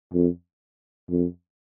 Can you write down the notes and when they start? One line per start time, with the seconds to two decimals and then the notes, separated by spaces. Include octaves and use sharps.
0.13 F2
1.10 F2